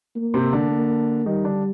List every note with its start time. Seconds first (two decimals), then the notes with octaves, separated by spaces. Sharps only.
0.16 A#3
0.34 C3 C4
0.53 D3 D4
0.71 A#3
1.26 D#3 G3 D#4
1.44 D3 D4